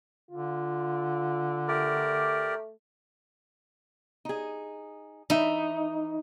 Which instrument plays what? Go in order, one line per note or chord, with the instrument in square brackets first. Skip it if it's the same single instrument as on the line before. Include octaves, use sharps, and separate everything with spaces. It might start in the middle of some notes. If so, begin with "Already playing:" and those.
[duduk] D3 [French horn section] F4
[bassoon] A3 [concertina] G4 A#4 D5
[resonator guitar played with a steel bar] D#4 G#4
[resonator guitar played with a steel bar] E3 E5 [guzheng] D#4